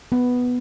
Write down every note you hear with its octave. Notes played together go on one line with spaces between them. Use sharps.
B3